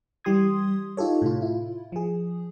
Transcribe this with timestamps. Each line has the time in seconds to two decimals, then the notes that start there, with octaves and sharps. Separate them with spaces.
0.24 E3 G3 G4 C6 D#6 G#6
0.97 D#4 F4 G4 A4 C#5
1.22 A2 C3 F4
1.42 E4 F4
1.92 F3 G#4